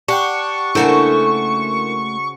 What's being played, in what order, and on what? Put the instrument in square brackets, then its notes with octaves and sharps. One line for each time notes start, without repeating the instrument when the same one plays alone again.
[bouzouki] D4 [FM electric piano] G4 F#5 G5 [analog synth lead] C#6
[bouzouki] C#3 F#4 C5 [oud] A3 A#3 [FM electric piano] D4 E4 A#4